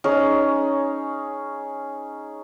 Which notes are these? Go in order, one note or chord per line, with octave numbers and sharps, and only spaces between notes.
C#4 D#4 G#4